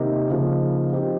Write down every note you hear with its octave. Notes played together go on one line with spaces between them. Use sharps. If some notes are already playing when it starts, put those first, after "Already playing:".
Already playing: C3 D#3 A#3 D#4 G4
C#3 F3 A#3 D#4
F3 C4 D#4 G4